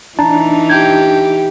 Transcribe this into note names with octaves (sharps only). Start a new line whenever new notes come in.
E3 D4 D#4 A5 A#5
G4 G6 G#6